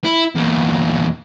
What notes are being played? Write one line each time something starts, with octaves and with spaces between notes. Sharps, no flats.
E4
E2 A#2